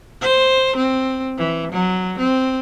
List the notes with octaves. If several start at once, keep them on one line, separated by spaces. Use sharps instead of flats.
C5
C4
E3
F#3
C4